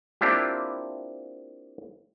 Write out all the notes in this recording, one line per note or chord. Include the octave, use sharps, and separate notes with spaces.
A#3 C4 D4 E4 F4 G4